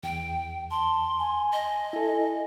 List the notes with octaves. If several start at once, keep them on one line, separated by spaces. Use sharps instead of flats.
E2 G5
A5 C6
G#5
D#5
E4 A4